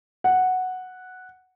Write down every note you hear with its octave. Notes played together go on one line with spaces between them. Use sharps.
F#5